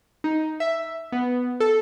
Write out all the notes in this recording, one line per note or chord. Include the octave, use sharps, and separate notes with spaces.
D#4
E5
B3
A4